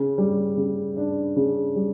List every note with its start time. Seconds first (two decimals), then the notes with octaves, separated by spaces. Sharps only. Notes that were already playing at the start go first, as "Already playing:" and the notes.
Already playing: C#3
0.18 G3
0.57 C#3
0.97 D4
1.36 C#3
1.75 G3